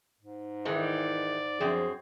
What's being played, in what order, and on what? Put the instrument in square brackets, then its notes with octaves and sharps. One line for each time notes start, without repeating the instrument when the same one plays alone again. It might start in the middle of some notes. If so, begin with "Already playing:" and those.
[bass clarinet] G#2
[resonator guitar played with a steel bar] D#3 E3 G#3 [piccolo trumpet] D5
[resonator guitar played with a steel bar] F#2 C4 [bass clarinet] F3 [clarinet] G#4